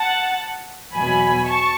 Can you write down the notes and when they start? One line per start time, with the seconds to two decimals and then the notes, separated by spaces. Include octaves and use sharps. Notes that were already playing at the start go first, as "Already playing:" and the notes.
Already playing: F#5 A5
0.94 E2 B2 F#3 G#5 B5
1.47 A5 C#6